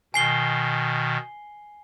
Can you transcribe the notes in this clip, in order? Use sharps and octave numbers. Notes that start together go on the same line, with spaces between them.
B2 D#3 G#5 C7 G7